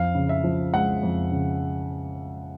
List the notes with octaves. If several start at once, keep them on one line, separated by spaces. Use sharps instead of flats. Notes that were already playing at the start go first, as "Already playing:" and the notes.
Already playing: F2 F5
C#3
E5
F3
G#3 F#5
F2
C#3